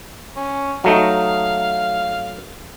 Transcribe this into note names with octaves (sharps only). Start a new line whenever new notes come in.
C#4
F#3 A3 D#4 F5